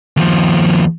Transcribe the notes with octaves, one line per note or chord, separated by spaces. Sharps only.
D#2 F3